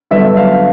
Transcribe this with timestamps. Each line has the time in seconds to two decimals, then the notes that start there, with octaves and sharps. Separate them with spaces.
0.11 G2 D3 F#3 B3 E5
0.37 F5